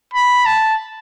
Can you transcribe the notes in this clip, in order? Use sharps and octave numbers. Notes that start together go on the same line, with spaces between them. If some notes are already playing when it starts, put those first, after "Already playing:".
B5
A5